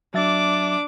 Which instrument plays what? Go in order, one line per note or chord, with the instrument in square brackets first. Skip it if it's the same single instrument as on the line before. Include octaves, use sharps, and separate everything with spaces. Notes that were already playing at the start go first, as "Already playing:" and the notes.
[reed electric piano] F#3 E5 A6 [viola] D4 D6